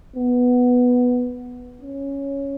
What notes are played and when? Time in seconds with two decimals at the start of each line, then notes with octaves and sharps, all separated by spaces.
0.16 B3
1.81 C#4